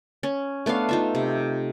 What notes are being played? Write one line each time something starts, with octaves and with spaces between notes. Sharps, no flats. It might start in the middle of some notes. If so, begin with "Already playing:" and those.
C#4
A3 B3 D4 F5
D#4 F4 E5
C3